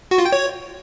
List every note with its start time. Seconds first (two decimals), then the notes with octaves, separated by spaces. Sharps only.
0.11 F#4
0.18 F4
0.25 G5
0.32 C#5